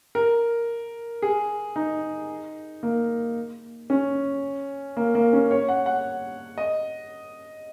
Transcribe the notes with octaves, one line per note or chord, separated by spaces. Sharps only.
A#4
G#4
D#4
A#3
C#4
A#3
A#3
C#4
C#5
F#5
F#5
D#5